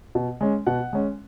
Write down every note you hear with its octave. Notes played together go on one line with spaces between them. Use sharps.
B2
G#3 C#4
B2 F#5
G#3 C#4